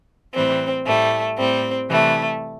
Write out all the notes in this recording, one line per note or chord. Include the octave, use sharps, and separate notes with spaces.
A2 E3 G3 C4
A2 G3 A3
A2 G3 C4
C3 E3 G3 A3